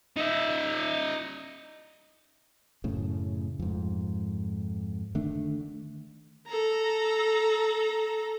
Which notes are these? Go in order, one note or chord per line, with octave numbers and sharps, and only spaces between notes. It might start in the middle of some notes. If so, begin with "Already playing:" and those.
D#4 E5
F#2 A2 C#3
F2 G#2
D3 D#3 A3 D4
A4 A#5